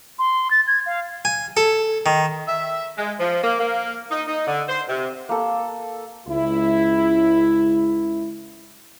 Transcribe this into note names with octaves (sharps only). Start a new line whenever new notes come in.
C6
A6
G#6
F5
G#5
A4
D#3
E5
G#3
F3
A#3
A#3
D#4
D#4
D3
C5
C3
A#3 A4
C#2 E4